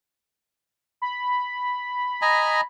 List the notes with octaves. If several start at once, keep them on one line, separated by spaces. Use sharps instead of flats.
B5
D#5 G#5 A#5